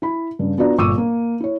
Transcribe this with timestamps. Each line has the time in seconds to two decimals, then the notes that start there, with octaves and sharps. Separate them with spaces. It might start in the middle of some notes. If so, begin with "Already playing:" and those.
0.02 E4 B5
0.39 G2 C#3
0.58 B3 D4 F4 F#4 D5 A#5
0.78 G1 A#2 C#6 D6 E6 D#7
0.98 A#3
1.40 E4 C#5